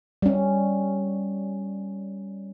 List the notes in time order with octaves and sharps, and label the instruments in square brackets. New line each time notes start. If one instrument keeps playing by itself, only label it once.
[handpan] G3 C#4